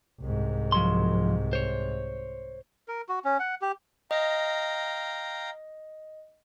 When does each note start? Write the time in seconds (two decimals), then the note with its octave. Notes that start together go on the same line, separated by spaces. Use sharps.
0.20 C2 G#2
0.72 F3 F#3 C6
1.53 C5 C#5
2.88 A#4
3.09 F#4
3.25 C#4
3.40 F#5
3.62 G4
4.11 D#5 F5 G5 A#5